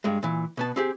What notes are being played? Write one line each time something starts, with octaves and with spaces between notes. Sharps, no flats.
G2 G#3
A#2 E3
B2 B3 A5
C4 G4 G#4